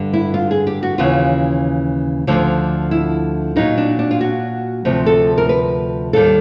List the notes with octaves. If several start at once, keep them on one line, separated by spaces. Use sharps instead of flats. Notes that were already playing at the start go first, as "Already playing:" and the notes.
Already playing: G2 D3 G3
E4
F4
G#4
G4
F#4
D#2 C#3 E3 F4
D2 D3 F3
E4
A#2 F#3 D#4
D4
D4
F4
F#4
D2 C3 F3
A4
A#4
B4
D#2 D#3 G3 A4